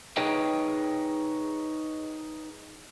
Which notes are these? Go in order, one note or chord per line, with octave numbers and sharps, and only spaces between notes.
D#4 G#4 B4 C#5 D#5 G5